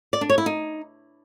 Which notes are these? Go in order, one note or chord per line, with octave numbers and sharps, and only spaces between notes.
D5
D4
C#5
E4
D#4